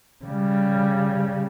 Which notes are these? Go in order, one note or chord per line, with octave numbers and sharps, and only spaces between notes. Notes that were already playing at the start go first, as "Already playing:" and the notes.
C#3 G3